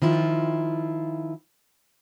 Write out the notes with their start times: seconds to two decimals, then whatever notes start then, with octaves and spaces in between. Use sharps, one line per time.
0.02 D#3 F3 E4 F4